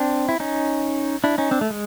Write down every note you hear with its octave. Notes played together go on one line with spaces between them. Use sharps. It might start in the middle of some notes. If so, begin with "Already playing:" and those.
Already playing: C4 D4
E4
C#4 D#4
D4 E4
C#4 D#4
C4 D4
A3
G#3